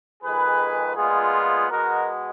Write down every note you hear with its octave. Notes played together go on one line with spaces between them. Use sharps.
F2 D#3 G#3 G#4 B4
A#2 G#3 B3 F4 G#4
B2 G#3 B3 F#4 A#4